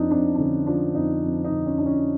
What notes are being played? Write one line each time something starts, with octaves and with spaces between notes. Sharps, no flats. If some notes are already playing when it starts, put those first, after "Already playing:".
Already playing: F2 F3 D4 D#4
F2 D4
D4
D3 C#4
F3 D4
F2 D#4
F2
D#4
D3
C#4
F3 D4
C#4